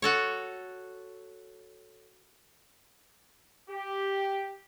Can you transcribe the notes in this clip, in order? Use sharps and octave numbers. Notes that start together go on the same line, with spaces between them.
F#4 A4 C#5
G4